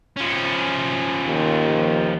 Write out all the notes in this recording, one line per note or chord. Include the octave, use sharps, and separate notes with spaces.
F3 C#4
D#2